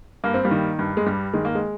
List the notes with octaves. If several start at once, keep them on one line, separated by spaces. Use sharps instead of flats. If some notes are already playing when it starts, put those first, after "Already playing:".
G2 A#3
C4
G3 A#3
D#3
G2
G#3
G2 G3
D#3 G#3
A#3
G#3